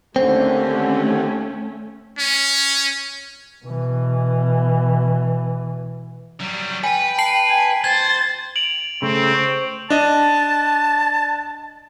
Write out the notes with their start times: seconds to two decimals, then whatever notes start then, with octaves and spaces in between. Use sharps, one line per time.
0.16 D#2 D3 A3 C4 C#4
2.18 C#4
3.65 B2 E3
6.40 F#3 G3
6.84 B4 G5 G#5
7.18 A5 C7 F#7
7.50 G#5
7.84 C5 G#6 A6
8.56 D7 F7 F#7
9.02 C#3 A3 C4
9.35 C5 C#6
9.90 D4 D#5 A5